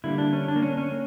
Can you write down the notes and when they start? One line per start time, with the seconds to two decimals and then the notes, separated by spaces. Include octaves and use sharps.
0.04 D3 G3 A#3 E4
0.18 D4
0.33 C#4
0.48 D4
0.56 A#3
0.62 C#4
0.77 C#4
0.92 A#3